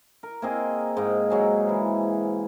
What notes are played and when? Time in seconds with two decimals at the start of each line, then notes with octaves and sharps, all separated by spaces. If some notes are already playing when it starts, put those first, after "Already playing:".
0.23 A#4
0.42 A#3 C4 G#4 D#5
0.97 G#2 A#3
1.30 G#2 F#3 G#4
1.69 E3